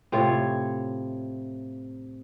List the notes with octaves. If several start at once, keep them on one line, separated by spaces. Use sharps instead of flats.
A2 C3 F4 C#5